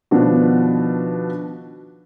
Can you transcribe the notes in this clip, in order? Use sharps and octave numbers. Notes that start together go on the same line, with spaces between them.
B2 D#3 F3 D4 F#4